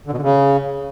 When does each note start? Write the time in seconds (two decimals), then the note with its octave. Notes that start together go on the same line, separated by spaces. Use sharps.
0.07 D3
0.12 B2
0.17 D3
0.22 C#3